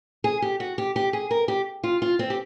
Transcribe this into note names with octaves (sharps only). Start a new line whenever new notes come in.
G#4
G4
F#4
G4
G4
G#4
A#4
G4
F4
F4
C4
G4